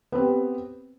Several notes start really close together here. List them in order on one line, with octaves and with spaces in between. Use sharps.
B3 C4 G4